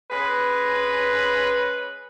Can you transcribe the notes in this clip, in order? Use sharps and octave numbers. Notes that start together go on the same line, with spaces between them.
G#3 C#4 B4